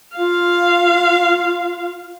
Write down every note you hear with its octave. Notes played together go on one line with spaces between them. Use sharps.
F4 F5